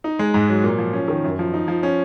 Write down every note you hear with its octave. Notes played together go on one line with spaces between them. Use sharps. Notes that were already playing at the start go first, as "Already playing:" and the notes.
D#4
G#3
G#2
F#3
A#2
F3
C#4
D#3
F#2
F3
D#4
F3
C#4